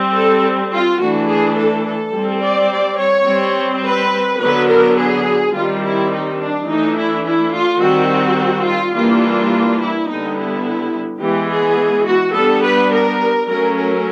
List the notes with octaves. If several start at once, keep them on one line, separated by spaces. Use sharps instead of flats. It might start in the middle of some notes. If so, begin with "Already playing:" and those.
Already playing: G3 C4
A4
F4
E3 A3 D4 F#4
G#4
A4
A4
G3 C4
D5
D5
C#5
G3 C4
B4
D3 F#3 B3 D4 B4
A#4
G#4
D#3 G3 C4 F4
E4
D#4
D4
E3 A3 D4 D#4
E4
E4
F4
D#3 G3 C4 F#4
F4
E3 G3 A#3 D4 F4
E4
D3 G3 B3 D#4
E4
E3 G#3 B3 G4
G#4
F#4
G3 B3 D4 A4
B4
A#4
F#3 A3 C#4 A#4
A#4